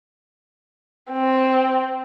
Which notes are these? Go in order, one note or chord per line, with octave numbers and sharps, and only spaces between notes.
C4